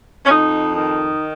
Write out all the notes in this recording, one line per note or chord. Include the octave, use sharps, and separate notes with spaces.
C#4
F2 D#4
D#3 D#4